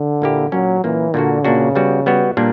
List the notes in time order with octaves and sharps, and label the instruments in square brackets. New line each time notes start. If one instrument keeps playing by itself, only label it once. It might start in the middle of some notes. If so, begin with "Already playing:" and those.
Already playing: [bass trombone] D3
[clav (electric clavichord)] A#2 A#3 E4 G4
[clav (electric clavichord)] A#2 A#3 C#4 [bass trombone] F#3
[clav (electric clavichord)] A#2 A#3 C#4 [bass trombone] E3
[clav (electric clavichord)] A#2 A#3 D4 F#4 [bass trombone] D3
[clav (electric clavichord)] A#2 A#3 D4 F#4 [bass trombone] C#3
[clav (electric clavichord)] G3 B3 F#4
G3 B3 F#4
A#2 G3 A#3 D4